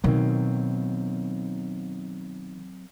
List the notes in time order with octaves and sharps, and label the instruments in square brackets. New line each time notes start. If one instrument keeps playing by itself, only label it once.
[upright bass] B2 D#3 [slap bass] F#3 C4